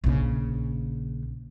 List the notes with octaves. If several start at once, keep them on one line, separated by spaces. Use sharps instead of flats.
A#1 C#3